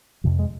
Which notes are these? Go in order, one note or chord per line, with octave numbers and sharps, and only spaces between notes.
F2 C3 F3
G#3